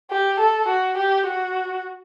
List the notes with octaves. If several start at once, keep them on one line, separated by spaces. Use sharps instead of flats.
G4
A4
F#4
G4
F#4